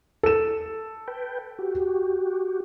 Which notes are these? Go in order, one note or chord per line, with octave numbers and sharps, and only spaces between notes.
A4 E7
B4 G5
F#4 G4